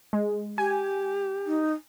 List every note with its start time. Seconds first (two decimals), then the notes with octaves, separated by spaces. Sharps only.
0.13 G#3
0.58 G4 G#5
1.47 D#4